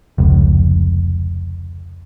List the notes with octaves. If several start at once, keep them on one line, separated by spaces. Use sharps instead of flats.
F1 C#2